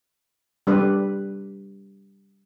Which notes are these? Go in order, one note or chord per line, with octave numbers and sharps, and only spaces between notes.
G3 D4 B4